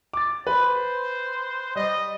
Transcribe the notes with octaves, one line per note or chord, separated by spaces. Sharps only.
D6 A6
B4 C5
G3 D#5